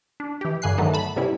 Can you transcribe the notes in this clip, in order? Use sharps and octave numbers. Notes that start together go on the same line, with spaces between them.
D4
E3 G4
G2 D3 G#5 F#6 C7
D3 D#3 F#3 A3 B3 D#4
A5 B5
C3 G3 B3 C#4 E4